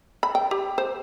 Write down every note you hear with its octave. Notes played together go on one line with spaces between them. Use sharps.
B5
G5
G4
C5